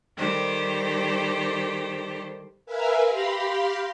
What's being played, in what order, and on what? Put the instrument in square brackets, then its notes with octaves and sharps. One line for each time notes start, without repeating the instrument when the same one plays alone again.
[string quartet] D#3 G3 G4 A4 C5
[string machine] A#4 B4 E5 F5 G#5
G4 F5 B5 C6 A#6